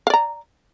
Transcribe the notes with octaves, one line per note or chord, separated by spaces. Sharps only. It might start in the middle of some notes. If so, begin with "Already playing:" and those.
D5 F5 A#5